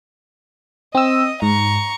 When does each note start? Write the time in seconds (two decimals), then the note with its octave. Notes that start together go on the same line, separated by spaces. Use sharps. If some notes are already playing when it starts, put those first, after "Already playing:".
0.95 C4 D#5 E6
1.42 G#2 A#5 C#6